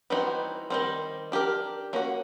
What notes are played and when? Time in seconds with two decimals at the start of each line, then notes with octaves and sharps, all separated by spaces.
0.10 E3 G3 C4 D#4 F#4
0.70 D#3 G3 C4
1.32 D4 G4 A#4
1.93 A#3 C#4 F#4